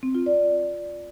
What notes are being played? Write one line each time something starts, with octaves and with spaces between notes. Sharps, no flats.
C4
F4
D5